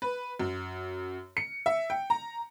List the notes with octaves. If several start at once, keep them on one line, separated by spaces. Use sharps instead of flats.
B4
F#2
C#7
E5
G5
A#5